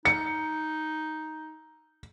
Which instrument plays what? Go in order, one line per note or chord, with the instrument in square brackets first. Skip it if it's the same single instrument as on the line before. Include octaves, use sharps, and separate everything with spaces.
[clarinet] D#4 [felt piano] C#7